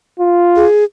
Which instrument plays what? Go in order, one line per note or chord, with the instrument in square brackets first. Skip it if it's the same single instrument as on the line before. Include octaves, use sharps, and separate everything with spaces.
[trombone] F4
[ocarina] G#4